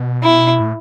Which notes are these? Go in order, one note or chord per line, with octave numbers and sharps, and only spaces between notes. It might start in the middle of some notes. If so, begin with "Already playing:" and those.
Already playing: B2
E4
A2